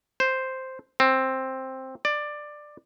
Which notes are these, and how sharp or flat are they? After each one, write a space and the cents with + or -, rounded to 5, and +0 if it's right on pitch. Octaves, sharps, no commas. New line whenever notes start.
C5 +0
C4 +10
D5 +15